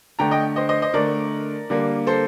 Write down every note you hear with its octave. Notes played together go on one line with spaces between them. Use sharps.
D3 A3 G5 A#5
D#5 G5
C5 D#5
C5 D#5
C5 D#5
D3 A3 A#4 D5
D3 G3 A#3
A4 C5